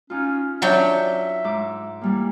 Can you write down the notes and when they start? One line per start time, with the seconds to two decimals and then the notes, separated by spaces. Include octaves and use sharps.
0.10 C#4 D#4 F4
0.62 F#3 D4 E5 G5
1.44 G#2 D6
2.01 E3 G3 A#3